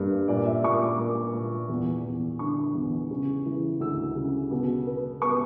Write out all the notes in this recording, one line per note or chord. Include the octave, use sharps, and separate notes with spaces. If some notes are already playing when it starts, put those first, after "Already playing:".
Already playing: G2 A#3
A#2 D5
E5
A#2 C#6
D6
A#3 D6
A#2
E2
E2
D3 C#6
E2
C#3
E3
D2 E6
C#3
B2
B3
B3 C#6